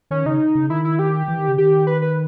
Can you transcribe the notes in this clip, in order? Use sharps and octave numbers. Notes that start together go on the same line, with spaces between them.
D#3 C#4
C#3 D#4
C#3
D#3 E4
E4
G4
E3
D#3
C#3
D#3 G4
B4
B4